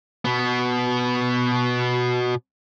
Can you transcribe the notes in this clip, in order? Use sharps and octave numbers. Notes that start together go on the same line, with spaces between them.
B2 B3